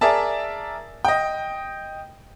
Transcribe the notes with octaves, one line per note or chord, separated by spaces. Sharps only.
G#4 A#4 D5 E5 A5
D#5 G5